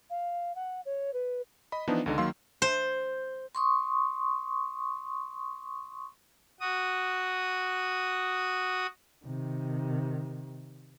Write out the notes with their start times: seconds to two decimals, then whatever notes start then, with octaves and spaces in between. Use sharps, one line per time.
0.10 F5
0.55 F#5
0.86 C#5
1.14 B4
1.72 D#5 B5
1.88 E3 F3 B3 D4 D#4
2.06 C#2 D3 D#4
2.18 D#3 F#3 A#3 F5 C6 E6
2.62 C5
3.55 C6 C#6 D#6
6.60 F#4 D#6
9.25 C3 D#3